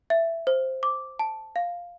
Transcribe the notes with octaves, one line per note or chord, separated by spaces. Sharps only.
E5
C5
D6
A5
F5